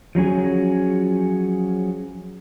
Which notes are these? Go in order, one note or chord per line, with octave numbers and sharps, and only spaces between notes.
F3 F#3 C#4 G#4